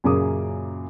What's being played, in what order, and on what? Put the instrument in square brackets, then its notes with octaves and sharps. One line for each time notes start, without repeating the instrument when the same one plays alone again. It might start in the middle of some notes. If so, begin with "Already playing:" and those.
[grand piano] F#2 A#2 C#3 A#3 D6 D#6